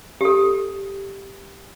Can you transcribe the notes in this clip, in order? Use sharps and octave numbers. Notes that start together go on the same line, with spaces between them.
G4 A4